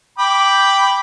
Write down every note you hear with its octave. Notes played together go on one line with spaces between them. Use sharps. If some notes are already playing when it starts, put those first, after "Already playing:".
G5 B5 D6